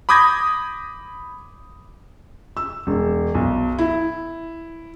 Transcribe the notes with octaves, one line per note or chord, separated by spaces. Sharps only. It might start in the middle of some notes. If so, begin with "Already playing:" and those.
B5 D6 D#6 G6 G#6 A#6
E6
E1
B1
E4